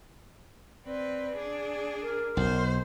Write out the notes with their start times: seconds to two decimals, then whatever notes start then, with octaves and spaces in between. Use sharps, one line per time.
0.86 C4 B4 D5
1.37 D4 G#4
2.02 A#4
2.37 B1 C5